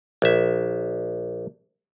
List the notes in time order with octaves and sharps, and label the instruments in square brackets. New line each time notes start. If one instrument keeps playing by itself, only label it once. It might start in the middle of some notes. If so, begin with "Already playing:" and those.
[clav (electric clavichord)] A#1 E5